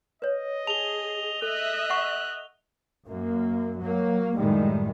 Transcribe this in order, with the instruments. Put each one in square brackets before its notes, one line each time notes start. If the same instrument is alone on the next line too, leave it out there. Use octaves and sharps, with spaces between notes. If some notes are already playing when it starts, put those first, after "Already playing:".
[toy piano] B4 C#5 [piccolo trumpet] D#5
[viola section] G#4 [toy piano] A5 [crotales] F7 G7
[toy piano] A4 [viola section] D#5 E5 [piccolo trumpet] F#6
[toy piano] F#5 C#6
[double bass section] F#2 A#3
F#3 A#3
F#2 A2 D#3 G3 G#3